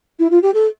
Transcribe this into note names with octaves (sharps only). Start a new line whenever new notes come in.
E4
F4
G4
A4